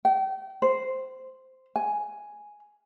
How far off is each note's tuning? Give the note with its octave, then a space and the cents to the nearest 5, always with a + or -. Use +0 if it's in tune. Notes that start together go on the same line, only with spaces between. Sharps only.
G5 -35
C5 -5
G#5 +0